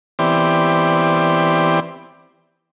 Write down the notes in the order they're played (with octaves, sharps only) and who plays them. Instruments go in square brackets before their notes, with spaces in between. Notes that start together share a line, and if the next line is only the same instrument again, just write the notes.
[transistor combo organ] E3 B3 C4 G4 D5